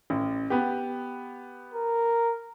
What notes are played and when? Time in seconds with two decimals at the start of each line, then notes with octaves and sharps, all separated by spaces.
0.10 A1
0.50 B3 G4
1.74 A#4